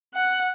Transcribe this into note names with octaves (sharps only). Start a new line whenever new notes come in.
F#5